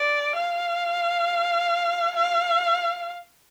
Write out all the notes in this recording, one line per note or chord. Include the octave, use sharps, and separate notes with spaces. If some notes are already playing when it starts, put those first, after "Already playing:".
Already playing: D5
F5
F5